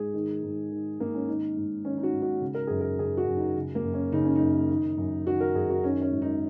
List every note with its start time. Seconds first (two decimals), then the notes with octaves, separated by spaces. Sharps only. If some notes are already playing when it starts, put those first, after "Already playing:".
Already playing: G#2 G#4
0.14 D#3
0.43 G#2
0.71 D#3
0.99 G#2 A#3
1.15 C#4
1.28 D#3 D#4
1.57 G#2
1.85 D#3 C#4
1.97 D#4
2.03 F#4
2.13 G#2
2.22 F#4
2.42 C#3
2.54 A#4
2.67 F#2 G#4
2.81 A#4
2.99 C#3 G#4
3.17 F#4
3.27 F#2
3.36 D#4
3.56 C#3
3.75 A#3
3.84 F#2
3.94 C#4
4.12 C#3 D#4
4.25 C#4
4.36 D#4
4.41 F#2
4.69 D#3
4.98 F#2
5.26 D#3 F#4
5.40 A#4
5.55 F#2 G#4
5.70 F#4
5.83 D#3 C#4
6.02 C#4
6.12 G#2
6.22 D#4